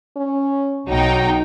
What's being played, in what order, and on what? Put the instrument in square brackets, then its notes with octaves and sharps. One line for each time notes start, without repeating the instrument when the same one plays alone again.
[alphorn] C#4
[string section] B1 D#4 G5 [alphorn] F#3